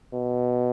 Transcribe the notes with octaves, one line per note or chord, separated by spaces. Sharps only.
B2